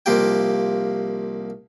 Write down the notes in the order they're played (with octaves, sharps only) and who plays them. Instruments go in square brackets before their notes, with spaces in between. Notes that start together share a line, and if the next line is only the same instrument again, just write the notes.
[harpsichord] C2 F3 A#3 G4 G5